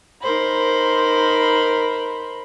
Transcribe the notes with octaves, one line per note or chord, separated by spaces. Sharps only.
D#4 A#4 C5 B5